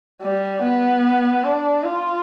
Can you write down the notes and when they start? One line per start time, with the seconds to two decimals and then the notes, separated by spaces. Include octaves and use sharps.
0.22 G3
0.62 B3
1.44 D4
1.84 F4